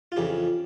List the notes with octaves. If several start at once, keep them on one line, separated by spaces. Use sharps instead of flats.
F4
F2 C#3 E3 G4